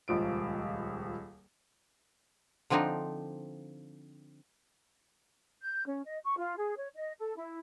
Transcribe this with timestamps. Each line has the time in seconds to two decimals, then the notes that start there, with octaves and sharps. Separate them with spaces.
0.08 D#1 C#2 F3 D7
2.70 D3 F3 C4 D4 D#4
5.61 G6
5.86 C#4
6.06 D#5
6.25 C#6
6.37 F4
6.56 G#4
6.77 C#5
6.95 D#5
7.18 A4
7.36 E4